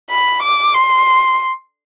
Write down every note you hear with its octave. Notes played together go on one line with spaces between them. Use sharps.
B5
D6
C6